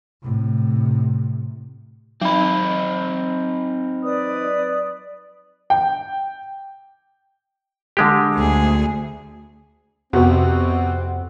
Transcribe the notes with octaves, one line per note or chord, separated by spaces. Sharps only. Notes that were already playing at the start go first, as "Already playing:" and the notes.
A2 C3
F#3 C4 D#4 B5
B4 D5 D#6
G5
D3 G#3 G4
D2 G#4
F2 C3 B3 C4 F#4